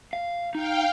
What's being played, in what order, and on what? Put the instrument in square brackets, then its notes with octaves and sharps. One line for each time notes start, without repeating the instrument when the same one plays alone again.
[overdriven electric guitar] F5
[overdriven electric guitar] D#4 [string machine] F5 G5